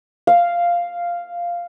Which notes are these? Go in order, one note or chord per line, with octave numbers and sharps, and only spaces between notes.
F5